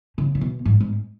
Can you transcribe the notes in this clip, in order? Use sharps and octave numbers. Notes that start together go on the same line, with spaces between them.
C#3
C#3
B2
G#2
G#2